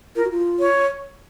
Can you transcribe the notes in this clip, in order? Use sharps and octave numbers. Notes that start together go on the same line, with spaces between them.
F4 A#4
F#4
F4
C#5